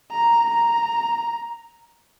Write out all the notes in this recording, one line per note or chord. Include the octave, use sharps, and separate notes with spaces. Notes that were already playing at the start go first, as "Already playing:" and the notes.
A#5
A#5